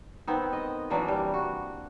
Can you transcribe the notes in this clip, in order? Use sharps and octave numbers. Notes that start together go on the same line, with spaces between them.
D#3 B3 C4
D#5
E3 F#3 A#3 D4
G3
F#4